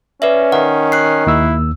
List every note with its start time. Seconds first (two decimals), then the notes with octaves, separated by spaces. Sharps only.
0.22 C#4 B4 D5 E5
0.52 D#3 F#5
0.92 F#6 C7
1.27 D#2 E4 E6